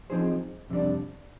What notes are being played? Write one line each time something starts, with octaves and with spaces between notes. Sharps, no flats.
F3 C4 D#4 G#4 C5
F2 C3 G3 D4